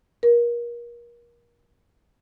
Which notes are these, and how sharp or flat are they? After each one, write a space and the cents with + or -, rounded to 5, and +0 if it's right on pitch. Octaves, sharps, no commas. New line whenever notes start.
A#4 +30